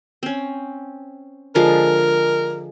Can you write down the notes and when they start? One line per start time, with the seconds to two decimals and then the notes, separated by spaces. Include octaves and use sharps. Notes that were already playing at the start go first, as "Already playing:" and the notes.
0.23 C4 C#4
1.55 D3 F3 G#3 A#4